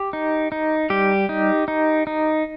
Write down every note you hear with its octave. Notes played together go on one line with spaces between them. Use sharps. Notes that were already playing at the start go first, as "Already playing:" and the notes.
Already playing: G4
D#4
D#4
G3 G4
D#4
D#4
D#4